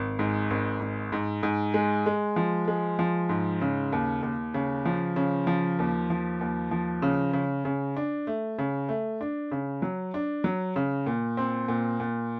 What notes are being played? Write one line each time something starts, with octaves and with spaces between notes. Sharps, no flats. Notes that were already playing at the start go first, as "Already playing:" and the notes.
Already playing: G#1
G#2
G#1
G#2
G#2
G#2
G#3
G#3
F3
G#3
F3
G#2
C#3
D#2
D#2
C#3
F3
C#3
F3
D#2
F3
D#2
F3
C#3
C#3
C#3
D4
A3
C#3
A3
D4
C#3
F#3
D4
F#3
C#3
A#2
C4
A#2
A#2